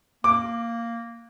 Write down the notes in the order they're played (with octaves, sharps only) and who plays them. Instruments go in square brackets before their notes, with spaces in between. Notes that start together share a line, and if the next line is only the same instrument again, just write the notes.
[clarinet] A#3 [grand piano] D6